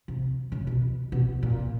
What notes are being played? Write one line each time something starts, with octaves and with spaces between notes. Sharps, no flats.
C3
C#3
B2
B2
A#2